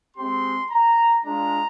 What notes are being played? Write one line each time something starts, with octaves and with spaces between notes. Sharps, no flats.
G#3 C4 G4 C6
A#5
G#3 D4 F4 A#5